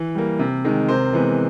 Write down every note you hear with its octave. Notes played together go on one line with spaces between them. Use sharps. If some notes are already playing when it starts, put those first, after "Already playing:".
Already playing: E3
G3 A#3
C3
D#3 G#3
C3 A#4 C5
E3 G#3 B3